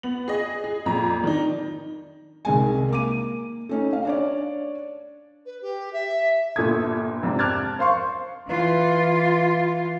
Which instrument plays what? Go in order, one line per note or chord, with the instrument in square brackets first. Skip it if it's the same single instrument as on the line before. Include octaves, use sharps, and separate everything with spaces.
[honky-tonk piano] B3 F#7
G#4 D#5
G#4
F2 A#2 A#5
D#3 D4 D#4
[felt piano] C2 D#3 G#3 G#5
A#3 D6 D#7
A3 C#4 D#4
F5
D4 C#5 D5
[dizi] B4
G4
E5
[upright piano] G1 A#2 A4 D#6 G#6
F2 G#2 C3 D4
A5 D6 F6 F#6 G#6 A6
C5 F5 C6 C#6
[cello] E3 F4